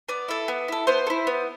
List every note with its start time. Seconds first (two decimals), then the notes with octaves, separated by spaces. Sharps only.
0.09 B3 D5
0.28 E4 A4
0.48 B3
0.68 E4 A4
0.87 B3 C5
1.07 A4
1.10 E4
1.27 B3